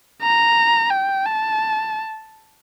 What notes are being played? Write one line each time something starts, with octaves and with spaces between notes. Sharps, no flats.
A#5
G5
A5